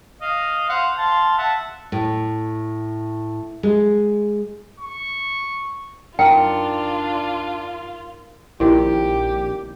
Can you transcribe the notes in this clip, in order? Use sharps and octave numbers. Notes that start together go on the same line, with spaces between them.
D#5 F5
C5 F5 F#5
F5 A5 C6
E5 F#5 A5
A2
G#3
C#6
F#2 D4 D#4 F4 A#4 G5
A#1 A#2 D#3 C4 E4 G4